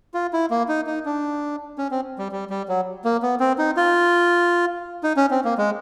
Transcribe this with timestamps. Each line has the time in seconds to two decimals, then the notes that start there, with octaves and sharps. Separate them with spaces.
0.14 F4
0.33 E4
0.50 A#3
0.68 D#4
0.87 D#4
1.05 D4
1.78 C#4
1.91 C4
2.18 G3
2.32 G3
2.50 G3
2.68 F#3
3.04 A#3
3.23 B3
3.40 C4
3.58 D#4
3.77 F4
5.03 D#4
5.17 C#4
5.31 C4
5.45 A#3
5.58 G#3